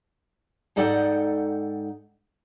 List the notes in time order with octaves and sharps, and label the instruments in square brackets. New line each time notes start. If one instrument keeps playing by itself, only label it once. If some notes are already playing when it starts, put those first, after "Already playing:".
[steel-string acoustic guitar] G#2 D#4 A4 D5 F#5 G5